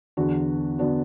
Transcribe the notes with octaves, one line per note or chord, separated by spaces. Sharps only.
E2 D3 B3 D4 F#4
D3 B3 D4 F#4